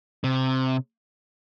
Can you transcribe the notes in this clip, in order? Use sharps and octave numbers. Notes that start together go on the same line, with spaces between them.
C3